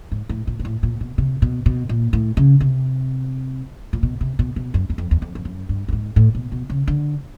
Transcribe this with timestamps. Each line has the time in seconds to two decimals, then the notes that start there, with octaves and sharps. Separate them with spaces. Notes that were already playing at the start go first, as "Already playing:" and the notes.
0.11 G#2
0.29 A2
0.47 A#2
0.59 A#2
0.65 A2
0.83 A#2
1.01 B2
1.18 C3
1.42 B2
1.66 B2
1.89 A#2
2.13 A2
2.37 C#3
2.61 C3
3.93 A#2
4.03 B2
4.21 C3
4.39 B2
4.56 B2
4.74 F#2
4.90 F#2
4.98 F2
5.11 E2
5.22 F2
5.35 F2
5.45 F#2
5.69 G2
5.88 G2
5.93 G#2
6.16 A2
6.35 B2
6.52 B2
6.70 C#3
6.88 D3